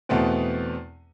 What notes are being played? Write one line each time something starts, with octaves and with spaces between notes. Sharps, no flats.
E2 B2 A3 B3 C4